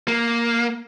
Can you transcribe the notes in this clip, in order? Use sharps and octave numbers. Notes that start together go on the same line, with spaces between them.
A#3